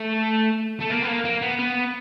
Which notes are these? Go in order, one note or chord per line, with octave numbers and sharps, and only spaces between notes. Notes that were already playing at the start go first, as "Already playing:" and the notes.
Already playing: A3
A3
A#3
B3
A#3
A#3
B3
B3